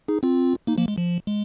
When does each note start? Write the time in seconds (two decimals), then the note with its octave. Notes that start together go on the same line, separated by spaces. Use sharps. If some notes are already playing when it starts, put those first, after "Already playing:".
0.08 D#4 G#4
0.23 C4 F4
0.67 A#3 D#4
0.78 F3 A#3
0.88 G#3
0.98 F3
1.27 G#3